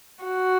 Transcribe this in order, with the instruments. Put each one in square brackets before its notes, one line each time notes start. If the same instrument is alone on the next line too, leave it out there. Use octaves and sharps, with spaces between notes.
[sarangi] F#4